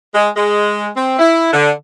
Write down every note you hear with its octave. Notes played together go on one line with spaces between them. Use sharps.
G#3
G#3
C4
E4
D3